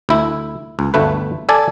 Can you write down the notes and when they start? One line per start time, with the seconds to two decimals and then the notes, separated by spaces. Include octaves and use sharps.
0.09 D2 E4
0.79 C#2
0.94 G1 D2 A3 B4
1.49 A4 D5 G#5 A5